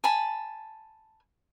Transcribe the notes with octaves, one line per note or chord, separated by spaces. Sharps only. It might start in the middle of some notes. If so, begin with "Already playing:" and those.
G#5 A5 B5